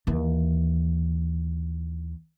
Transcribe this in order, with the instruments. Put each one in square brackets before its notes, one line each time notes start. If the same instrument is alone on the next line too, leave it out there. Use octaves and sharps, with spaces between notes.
[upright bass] D#2 E3